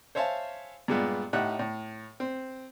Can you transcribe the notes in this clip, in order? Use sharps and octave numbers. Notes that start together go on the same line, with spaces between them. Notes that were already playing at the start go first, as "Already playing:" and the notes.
C5 C#5 E5 F5 G#5 A5
G2 A#2 G#3 B3 F4
A2 D#4 G4 E5 F#5 F#6
A2
C4